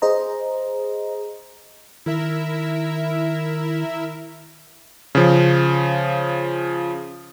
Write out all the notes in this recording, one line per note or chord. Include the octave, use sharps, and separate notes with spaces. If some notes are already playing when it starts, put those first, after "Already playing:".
G#4 C5 D#5 A#5
D#3 E4 A#4 E5
C#3 F3